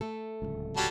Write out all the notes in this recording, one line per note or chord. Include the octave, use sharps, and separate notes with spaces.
A3 A4
D1 G#1 C#2
F#3 G3 A5